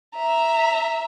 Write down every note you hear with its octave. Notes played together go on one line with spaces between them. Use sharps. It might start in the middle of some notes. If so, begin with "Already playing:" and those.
E5 A#5